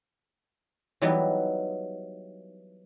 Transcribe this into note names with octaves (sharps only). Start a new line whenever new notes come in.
E3 F#3 G3 B3 D#4